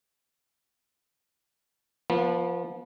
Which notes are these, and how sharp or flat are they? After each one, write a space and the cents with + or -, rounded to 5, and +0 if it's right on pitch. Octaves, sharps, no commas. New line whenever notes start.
F3 +0 B3 -35